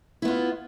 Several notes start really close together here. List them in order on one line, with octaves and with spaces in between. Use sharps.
E4 B3 F4